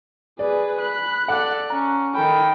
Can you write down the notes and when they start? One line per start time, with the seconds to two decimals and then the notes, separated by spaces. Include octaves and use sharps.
0.39 G#4 B4 D5
0.81 B5 F#6
1.28 A4 D5 F#5
1.70 C#4 A#5
2.15 D#3 A4 G5 B5